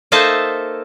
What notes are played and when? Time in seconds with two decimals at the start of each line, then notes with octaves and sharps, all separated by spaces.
0.12 A#3 D#4 A4 C5 E5 A5